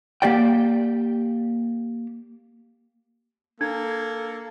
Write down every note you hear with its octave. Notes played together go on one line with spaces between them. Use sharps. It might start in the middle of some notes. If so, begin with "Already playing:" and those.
A#3 G4 D5 G5
A#3 D4 A4 G#6